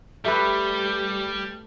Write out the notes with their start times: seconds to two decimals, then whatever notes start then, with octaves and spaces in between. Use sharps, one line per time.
0.25 G3 A3 G4 B4